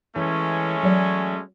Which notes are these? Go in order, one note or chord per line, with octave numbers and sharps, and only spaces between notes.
E3 G#3 A3 C#4
F#3 D5